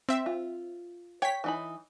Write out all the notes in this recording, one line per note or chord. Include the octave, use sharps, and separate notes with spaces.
C4 E5
F4
C#5 G5 B6
E3 D#4 B5